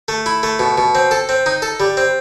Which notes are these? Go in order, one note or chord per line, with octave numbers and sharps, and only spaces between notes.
A3
E4
A3
B2
B2
C4
A4
C4
D#4
A4
G3
C4